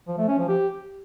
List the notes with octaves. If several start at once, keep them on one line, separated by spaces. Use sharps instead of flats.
F3
A3
C#4
F3
G4